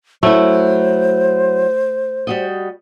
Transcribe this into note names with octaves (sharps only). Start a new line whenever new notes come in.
F#3 A3 E4 C5
G3 F#4 D#5